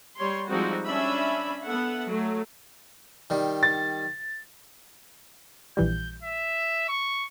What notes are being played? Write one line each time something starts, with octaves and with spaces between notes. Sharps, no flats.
G3 C#5 C6
F3 G3 G#3 C4 D#4 F#4
C#4 D4 E5 B5
B3 A4 E5 F#5
F#3 A3
D#3 G3
A6
A#1 E3 G3 G6
E5
C#6